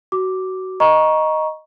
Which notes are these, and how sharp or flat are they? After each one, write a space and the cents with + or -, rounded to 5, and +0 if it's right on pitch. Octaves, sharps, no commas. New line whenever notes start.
F#4 +20 D6 +0
D#5 +0 A#5 +25 C#6 +0